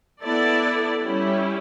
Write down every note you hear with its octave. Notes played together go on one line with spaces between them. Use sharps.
B3 E4 A4 D5
G3 C#4 E4 G4